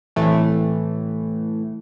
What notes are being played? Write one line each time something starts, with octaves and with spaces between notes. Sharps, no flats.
C2 A2 E3 A3